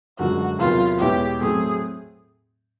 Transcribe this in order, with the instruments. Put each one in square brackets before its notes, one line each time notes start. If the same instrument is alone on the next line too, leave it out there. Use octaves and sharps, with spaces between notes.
[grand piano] F#2 D3 F3 G#3 [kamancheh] F#4
[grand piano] E2 C3 D#3 F#3 [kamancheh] F4
[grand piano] E2 B2 G#3 C#4 E4 [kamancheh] G4
[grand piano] A2 F#3 A3 C4 [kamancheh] G#4